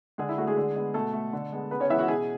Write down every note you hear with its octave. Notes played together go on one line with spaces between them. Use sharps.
D3 G#3 G#4
E4
A3 F#4
G#3 G#4
D3
G#3 B3
B2 A3 A4
A3
D3
G#3 B3
C#3 B3 B4
C#4 C#5
E3 G#3 B3 E4 E5
F#4 F#5
B2 G#4 G#5